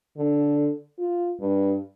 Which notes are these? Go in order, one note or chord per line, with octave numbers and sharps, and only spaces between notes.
D3
F4
G2